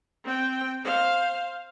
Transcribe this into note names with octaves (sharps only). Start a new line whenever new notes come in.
C4 G5
C5 F5